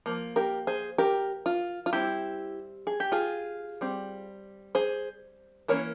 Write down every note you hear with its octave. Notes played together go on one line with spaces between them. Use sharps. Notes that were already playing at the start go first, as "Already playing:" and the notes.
F3 A#3
G4 A#4
G#4 C5
G4 A#4
F4
F4
G3 C4 E4 G4
G#4
G4
F4 G#4
G3 C4
G#4 C5
E3 A#3 C#4 A#4 C#5